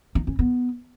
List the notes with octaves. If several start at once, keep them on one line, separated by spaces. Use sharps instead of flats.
D#4
C#4
B3